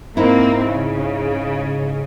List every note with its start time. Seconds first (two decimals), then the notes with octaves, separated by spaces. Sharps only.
0.17 G#2 A#3 C4 D#4 E4
0.69 C#3